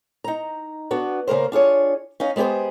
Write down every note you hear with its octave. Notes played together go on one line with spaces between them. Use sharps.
D#4 A#5
B3 D4 F#4
C#3 A#3 A#4 C5
D4 F4 G#4 C#5
C#4 D#4 F5
G#3 B3 G4 G#4 C5